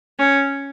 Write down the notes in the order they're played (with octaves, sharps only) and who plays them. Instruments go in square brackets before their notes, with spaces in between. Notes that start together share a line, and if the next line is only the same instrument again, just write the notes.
[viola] C#4